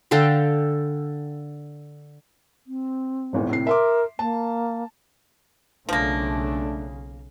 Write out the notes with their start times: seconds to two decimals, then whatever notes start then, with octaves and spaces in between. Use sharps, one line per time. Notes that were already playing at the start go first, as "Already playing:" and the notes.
0.11 D3 A4 F5 G5
2.67 C4
3.33 D#1 G#1 E2
3.49 A2 C3 C7
3.67 A#4 E5 C6 D6
4.19 A#3 A5
5.89 B1 C#3 F3 A3 A#3 D4